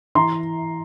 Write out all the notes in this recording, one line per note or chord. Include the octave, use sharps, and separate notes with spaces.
E3 A#5 C6